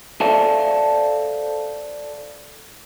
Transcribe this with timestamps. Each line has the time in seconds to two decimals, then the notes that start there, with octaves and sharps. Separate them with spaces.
0.21 A4 C5 D5 E5 F5 A5